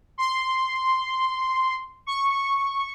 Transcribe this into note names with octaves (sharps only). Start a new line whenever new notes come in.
C6
C#6